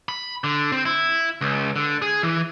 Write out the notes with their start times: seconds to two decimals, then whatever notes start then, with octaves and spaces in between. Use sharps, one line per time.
0.09 B5
0.44 D3
0.72 C4
0.85 E4
1.41 C#2
1.76 D3
2.02 G#4
2.23 E3